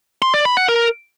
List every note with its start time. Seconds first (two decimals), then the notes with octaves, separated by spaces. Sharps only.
0.22 C6
0.34 D5
0.45 B5
0.57 F#5
0.69 A#4